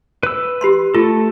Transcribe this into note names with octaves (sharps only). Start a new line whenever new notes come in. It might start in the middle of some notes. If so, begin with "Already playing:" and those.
B4 E6
G4 B5 C6
A3 F4 A4